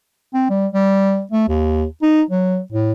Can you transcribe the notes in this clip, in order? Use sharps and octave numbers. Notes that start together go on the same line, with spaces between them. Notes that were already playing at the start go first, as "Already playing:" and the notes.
C4
G3
G3
A3
D#2
D#4
F#3
A2